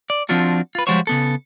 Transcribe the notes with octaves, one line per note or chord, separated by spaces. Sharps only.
D5
F3 C4 D4 F4 F#4
F4 B4
F3 G3 G#3 F#4 C5 C#5
C#3 B3 A4